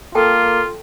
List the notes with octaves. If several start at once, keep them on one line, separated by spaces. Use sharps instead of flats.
A#3 F4 A4 G5 A5